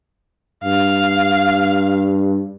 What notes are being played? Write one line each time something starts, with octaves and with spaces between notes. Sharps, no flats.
G2 F5